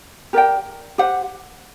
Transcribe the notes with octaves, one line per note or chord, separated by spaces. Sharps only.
G4 A#4 D5 G5
G4 C5 F#5